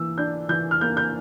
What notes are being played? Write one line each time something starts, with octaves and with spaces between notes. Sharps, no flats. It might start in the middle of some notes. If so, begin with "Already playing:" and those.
Already playing: E3 A#3 E6
D4 G6
E3 G6
F6
A#3 G6
G6